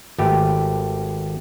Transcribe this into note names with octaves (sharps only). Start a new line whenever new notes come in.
G#1 A3 G4 B4